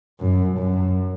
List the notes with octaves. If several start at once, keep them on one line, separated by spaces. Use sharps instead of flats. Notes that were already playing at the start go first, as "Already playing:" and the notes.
F#2
F#2